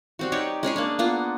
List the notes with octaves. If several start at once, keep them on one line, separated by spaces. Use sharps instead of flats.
G3 C4 F#4
D#4 G4 C#5 D5
G#3 C#4 G#4 C#5
A#3 D4
A#3 B3 F4